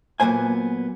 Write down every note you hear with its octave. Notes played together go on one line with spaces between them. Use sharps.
A#2 F#3 A#3 B3 C5 G#5